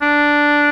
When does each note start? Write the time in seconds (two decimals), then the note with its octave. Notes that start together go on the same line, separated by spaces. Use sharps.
0.02 D4